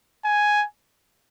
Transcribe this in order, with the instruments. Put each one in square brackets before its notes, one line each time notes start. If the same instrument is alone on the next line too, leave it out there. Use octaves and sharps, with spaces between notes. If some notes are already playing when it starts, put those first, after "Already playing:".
[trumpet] G#5